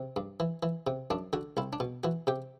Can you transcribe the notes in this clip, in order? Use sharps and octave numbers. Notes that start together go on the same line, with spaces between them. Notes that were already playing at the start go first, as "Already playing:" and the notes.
Already playing: C3
G2
E3
E3
C3
F#2 D4
D3 F#4
C2 E4
D4
B2
E3 F#4
C3 G4